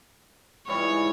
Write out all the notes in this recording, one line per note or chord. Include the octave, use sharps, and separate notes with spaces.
G#2 E3 G3 C#5